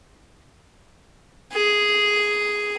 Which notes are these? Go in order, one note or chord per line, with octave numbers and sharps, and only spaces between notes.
G#4